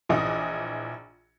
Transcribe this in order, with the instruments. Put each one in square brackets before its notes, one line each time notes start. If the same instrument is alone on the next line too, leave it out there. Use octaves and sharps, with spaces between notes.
[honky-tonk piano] A#1 E3 D#5 D#6